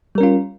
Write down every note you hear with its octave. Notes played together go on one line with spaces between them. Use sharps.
G3 C#4 F4 A#4